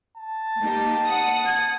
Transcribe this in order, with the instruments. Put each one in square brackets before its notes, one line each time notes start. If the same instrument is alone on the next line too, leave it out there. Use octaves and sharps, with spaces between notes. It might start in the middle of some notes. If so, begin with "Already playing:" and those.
[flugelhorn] A5
[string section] A#3 D#4 G4
F#5 D#6
[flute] G#6